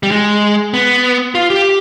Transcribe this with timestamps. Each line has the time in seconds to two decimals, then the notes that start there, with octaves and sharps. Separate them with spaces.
0.03 G3
0.11 G#3
0.74 B3
1.35 F4
1.50 G4